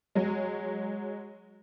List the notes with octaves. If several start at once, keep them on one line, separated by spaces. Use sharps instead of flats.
F#3 G#3